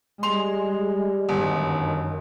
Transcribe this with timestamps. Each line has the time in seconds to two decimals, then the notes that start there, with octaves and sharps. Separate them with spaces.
0.23 G3 G#3 C6 F7
1.29 G1 F#2 D#3